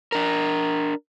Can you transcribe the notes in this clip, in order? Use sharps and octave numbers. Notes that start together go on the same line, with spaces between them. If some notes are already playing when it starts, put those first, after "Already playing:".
D4 A#4